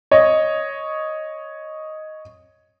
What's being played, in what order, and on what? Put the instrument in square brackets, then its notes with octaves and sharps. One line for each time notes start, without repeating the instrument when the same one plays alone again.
[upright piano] C#5 D#5